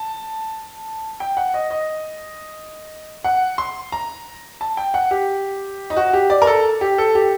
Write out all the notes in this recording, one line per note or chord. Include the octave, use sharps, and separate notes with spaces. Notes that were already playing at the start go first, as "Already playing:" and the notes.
Already playing: A5
G5
F#5
D#5
D#5
F#5
C6
A#5
A5
G5
F#5
G4
D#4
F#4
G4
D5
A#4
A4
G4
A4
G4